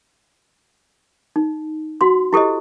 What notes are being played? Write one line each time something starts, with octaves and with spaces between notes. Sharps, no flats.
D#4
F#4 F#5 C6
E4 G4 A4 C5 D#5